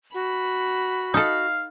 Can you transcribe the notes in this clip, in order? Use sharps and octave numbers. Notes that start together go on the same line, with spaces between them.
F#4 B5
D#4 A4 F5